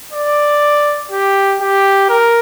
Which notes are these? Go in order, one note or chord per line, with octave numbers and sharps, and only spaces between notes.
D5
G4
G4
A#4